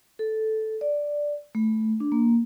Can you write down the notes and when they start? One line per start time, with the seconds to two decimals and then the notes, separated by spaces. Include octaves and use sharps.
0.19 A4
0.81 D5
1.55 A3
2.00 D4
2.12 A#3